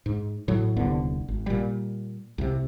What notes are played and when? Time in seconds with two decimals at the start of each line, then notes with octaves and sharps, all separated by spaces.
0.06 G#2
0.48 A2 F#3
0.76 D#1 C2 D3 B3
1.28 G#1
1.46 A#2 G3
2.38 C2 C3